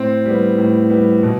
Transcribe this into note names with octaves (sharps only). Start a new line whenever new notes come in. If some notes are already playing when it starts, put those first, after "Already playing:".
Already playing: A2 C4
G3 B3
A2
G3 B3
B2